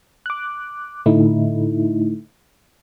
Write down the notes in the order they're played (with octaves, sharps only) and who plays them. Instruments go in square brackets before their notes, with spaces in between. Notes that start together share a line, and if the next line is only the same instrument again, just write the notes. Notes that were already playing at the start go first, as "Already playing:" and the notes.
[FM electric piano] D6 F#6
A2 D3 A3 D#4 E4